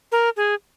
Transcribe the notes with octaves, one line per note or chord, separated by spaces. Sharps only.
A#4
G#4